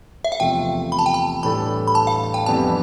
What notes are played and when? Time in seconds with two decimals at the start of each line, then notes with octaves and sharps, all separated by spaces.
0.25 E5
0.32 F5
0.40 E2 C3 F3 A3 G5
0.92 B5
0.99 A5
1.06 G5
1.14 A5
1.43 A2 E3 G3 D4 A4 B5
1.87 B5
1.95 A5
2.07 F5
2.34 G5
2.46 F2 E3 G3 B3 D4 A5